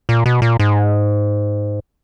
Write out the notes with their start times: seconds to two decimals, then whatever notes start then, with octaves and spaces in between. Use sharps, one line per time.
0.09 A#2
0.26 B2
0.42 A#2
0.59 G#2